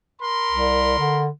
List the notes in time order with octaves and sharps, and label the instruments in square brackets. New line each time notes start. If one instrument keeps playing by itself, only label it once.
[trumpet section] A#4 B5 C6
[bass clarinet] C2
D3